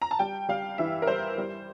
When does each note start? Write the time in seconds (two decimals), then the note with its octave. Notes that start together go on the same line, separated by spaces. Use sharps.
0.02 A#5
0.11 A5
0.19 G3 G5
0.49 G3 F5
0.78 E3 E5
1.02 A#4
1.07 G3 C5
1.38 G3